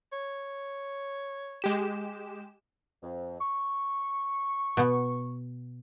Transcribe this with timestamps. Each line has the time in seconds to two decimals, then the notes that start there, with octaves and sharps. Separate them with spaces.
0.13 C#5
1.62 G#3 G4 E7
3.02 F2
3.40 C#6
4.77 B2 B3